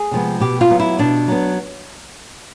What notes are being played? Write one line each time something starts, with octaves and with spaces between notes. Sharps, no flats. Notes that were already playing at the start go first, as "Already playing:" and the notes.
Already playing: G#4
C3 F3 G#3 B3
B2 G4
F4
F#3 B3
E4
B2 D4
F#3 B3